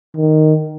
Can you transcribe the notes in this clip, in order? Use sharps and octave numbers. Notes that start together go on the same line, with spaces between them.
D#3